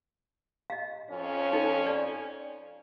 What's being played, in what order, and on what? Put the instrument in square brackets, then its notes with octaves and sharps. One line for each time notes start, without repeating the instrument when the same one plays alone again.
[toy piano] D#5 F5
[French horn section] F2 C#4
[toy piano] D#4 A4
D5